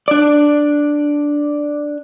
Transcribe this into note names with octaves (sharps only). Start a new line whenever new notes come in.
D4 D5